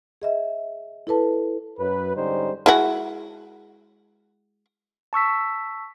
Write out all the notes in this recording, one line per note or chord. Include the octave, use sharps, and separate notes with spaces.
G#4 D#5 E5
E4 A4 B4 A5
F#2 B4
G#2 D3 G3 C#4 D#4 C5
G#3 E4 F#4
A5 C#6 E6 B6